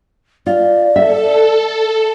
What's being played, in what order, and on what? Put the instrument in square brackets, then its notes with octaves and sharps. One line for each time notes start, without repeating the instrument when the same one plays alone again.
[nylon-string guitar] F4 [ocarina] D5
[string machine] A4 [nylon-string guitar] E5